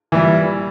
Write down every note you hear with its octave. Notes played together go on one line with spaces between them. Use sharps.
A#1 A#2 E3 G3